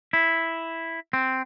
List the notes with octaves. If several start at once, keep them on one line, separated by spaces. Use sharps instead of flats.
E4
C4